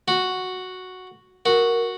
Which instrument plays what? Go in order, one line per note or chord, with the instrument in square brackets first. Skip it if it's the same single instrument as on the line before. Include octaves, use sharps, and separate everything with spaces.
[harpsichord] F#4
[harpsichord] F#4 [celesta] A#4